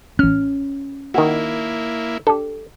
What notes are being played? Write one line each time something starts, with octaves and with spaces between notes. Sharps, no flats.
A1 C#4 F6
D#3 A#3 E4 F#4
D4 G4 A4